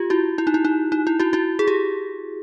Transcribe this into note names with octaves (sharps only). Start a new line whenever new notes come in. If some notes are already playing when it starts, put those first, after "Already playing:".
Already playing: F4 G4
E4 F#4
E4
D#4
E4
D#4
D#4
E4
E4 F#4
E4 F#4
G#4
G4